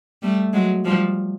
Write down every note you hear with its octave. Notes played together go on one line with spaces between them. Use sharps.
G3 A3
F#3 G#3
F3 G3